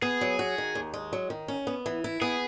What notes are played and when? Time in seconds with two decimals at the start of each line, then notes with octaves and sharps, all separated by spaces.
0.02 B3 G#4
0.21 F#3
0.39 F#4
0.58 D#3
0.75 D#2
0.94 G#3
1.13 F#3
1.30 D#3
1.48 C#4
1.67 B3
1.86 E3
2.04 E4
2.22 B3 G#4